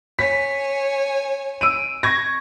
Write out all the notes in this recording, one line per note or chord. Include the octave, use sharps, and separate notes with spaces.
C#5 G#5 B6
E6 D7 D#7
C#6 G#6 A#6